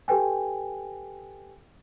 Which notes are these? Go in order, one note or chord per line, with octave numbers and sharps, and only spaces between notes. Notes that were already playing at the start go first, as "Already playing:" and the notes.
G4 A4 B4 G5 G#5